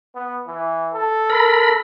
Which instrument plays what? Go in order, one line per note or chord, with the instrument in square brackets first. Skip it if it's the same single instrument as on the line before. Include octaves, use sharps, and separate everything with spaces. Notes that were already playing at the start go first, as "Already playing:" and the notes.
[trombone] B3
E3
A4
[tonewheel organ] A#4 B5